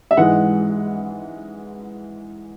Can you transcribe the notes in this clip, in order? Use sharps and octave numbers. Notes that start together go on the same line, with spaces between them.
E5
G#2 E3 G#3 F#5